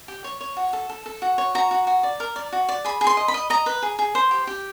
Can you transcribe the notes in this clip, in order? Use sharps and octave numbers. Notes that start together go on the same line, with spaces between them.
G4
C#5
C#5
F#4
A4
A4
A4
F#4
C#5
F#4 A#5
F#4
F#4
D5
A#4
D5
F#4
D5
G#4 B5
G#4
C6
D#5
B5
D#5
D#5 A#5
B4
G#4
G#4
C5
G4
G4